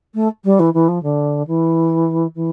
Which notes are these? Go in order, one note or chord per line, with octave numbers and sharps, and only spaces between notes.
A3
G3
E3
E3
F3
D3
E3
E3